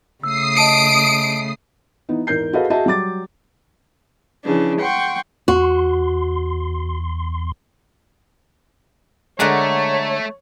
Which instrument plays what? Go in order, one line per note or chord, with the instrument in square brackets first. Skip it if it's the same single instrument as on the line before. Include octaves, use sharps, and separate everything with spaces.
[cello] C#3 A3 [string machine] D#6 C7 [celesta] E6
[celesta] D#5 A5 D#7 [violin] D7
[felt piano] E3 B3 D#4
E2 G#2 A#4 G6 C7
F#4 G#4 A4 B4 D#5 F5
F#4 G#4 D#5 E5 A5
F#3 G3 D6 A6
[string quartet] C#3 E3 F3 D4
F#5 G5 C6 C#6
[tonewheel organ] E2 C6 [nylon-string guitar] F#4
[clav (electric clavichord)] D3 G#3 [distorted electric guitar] A3 [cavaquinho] A#4 F#5 D6 [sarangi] C#5